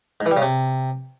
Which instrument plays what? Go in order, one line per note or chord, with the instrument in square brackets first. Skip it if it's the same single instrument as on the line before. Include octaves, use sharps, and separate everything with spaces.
[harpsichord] G#2
E3
G3
C#3
C3